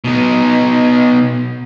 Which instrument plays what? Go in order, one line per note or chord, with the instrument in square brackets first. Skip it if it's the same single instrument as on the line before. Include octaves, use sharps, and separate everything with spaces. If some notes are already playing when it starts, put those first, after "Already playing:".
[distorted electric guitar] B2 D#4